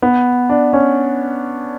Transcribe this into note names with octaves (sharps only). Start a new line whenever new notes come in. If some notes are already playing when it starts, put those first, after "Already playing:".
B3
D4
C#4